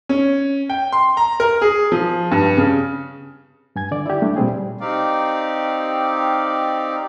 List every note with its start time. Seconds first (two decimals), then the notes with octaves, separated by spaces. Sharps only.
0.09 C#4
0.69 G5
0.93 C6
1.17 A#5
1.40 A#4
1.62 G#4
1.92 F3
2.31 G2
2.57 C#3
3.76 G2 G#5 G#6
3.91 D3 D5
4.06 E4 G4
4.22 G3 A3 D4
4.36 A#2 G3 C4 G#4
4.80 C4 D#4 G4 D5 F5